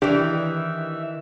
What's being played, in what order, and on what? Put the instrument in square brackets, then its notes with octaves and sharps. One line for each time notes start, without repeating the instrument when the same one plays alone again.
[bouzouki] D#3 E3 [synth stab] D4 G4 [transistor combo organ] E5